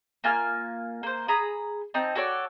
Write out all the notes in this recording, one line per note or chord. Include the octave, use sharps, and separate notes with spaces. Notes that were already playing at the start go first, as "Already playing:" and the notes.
A#3 F4 G#5 F6
A#3 C5
G#4 A#5 B5 D#6
C4 D#4 A5
F#4 A4 C#5 D5